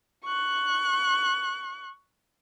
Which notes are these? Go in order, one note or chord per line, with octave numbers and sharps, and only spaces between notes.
C#6 F#6